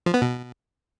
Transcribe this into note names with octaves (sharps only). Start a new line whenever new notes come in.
F3
B3
B2